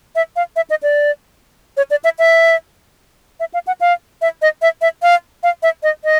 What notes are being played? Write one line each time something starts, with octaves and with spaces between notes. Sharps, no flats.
E5
F5
E5
D#5
D5
C#5
D5
E5
E5
E5
F5
F#5
F5
E5
D#5
E5
E5
F5
F5
E5
D#5
D#5